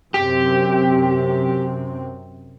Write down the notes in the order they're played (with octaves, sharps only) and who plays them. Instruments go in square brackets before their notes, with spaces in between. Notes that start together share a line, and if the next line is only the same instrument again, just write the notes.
[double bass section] F#2 C3 C4 [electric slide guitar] G4